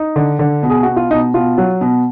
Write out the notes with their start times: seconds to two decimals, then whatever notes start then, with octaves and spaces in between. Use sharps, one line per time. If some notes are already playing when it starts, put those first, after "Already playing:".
Already playing: D#4
0.16 D3
0.39 D3
0.63 B2
0.70 G#4
0.83 B2 F#4
0.96 F4
1.10 B2 D#4
1.34 B2 F4
1.58 F#3
1.81 B2